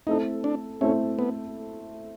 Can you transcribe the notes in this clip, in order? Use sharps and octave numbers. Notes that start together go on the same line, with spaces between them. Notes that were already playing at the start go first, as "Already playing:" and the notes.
A3 C4 D#4 E4 A4
D4
A3 C4 C#4 E4 A4
B3